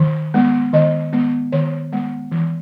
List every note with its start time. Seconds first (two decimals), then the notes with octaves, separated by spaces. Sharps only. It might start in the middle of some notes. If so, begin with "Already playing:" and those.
Already playing: D#3
0.34 G#3 B3
0.73 D#3 D#5
1.12 G#3 B3
1.52 D#3 C#5
1.92 G#3 B3
2.31 E3